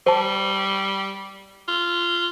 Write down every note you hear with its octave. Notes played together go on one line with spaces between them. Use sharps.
G3 C5 A5
F4